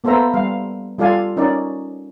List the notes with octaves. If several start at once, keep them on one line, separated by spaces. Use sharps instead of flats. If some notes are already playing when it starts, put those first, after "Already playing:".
A#3 B3 A4 C5 E5 A#5
G3 F5
G3 F4 A4 D5 F5 G#5
C#4 D#4 A#4 D5